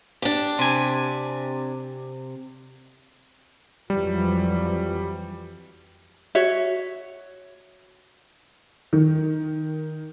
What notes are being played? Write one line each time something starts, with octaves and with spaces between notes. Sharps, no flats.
D4 G4
C3 G#5
F2 E3 F#3 G3
F#4 C#5 E5
D#3